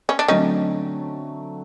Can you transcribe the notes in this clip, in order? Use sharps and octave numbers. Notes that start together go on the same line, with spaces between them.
C#4
D4
D3 F#3 A3 C4 C#4 D#4